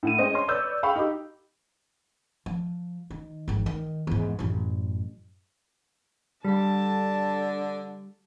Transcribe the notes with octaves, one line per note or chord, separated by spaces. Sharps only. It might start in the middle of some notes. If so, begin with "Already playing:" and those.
A2 F#5 D#7
G#3 C4 C#4 C5 D#5
C#5 C6
B4 C#5 D5 E6 G6
G#4 F5 G5 B5 C#6
D#4 G4
F3
D#3
G#1 F2
D#3
E2 G#2
A1 F#2
D3 G3 A5